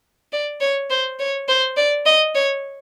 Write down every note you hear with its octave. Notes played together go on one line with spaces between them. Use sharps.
D5
C#5
C5
C#5
C5
D5
D#5
C#5